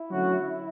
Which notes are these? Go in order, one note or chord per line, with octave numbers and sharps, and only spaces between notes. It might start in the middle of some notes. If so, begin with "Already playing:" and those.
Already playing: E4
D3 F#3 A3 C#4 F#4